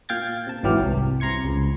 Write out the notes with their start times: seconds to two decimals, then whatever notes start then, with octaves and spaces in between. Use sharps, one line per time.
0.09 A#2 F5 G5 G#6 A6
0.47 C3 A5
0.63 G#1 G#2 E3 F#3 G4 F6
0.82 C2
1.20 C3 A#5 C6 G#6 C#7
1.45 C#2